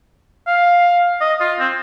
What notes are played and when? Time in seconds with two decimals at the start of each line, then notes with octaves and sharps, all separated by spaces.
0.47 F5
1.21 D#5
1.41 F4
1.59 C4